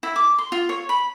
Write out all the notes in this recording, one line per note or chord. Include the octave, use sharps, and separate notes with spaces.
E4
D6
C6
F4
C#5
B5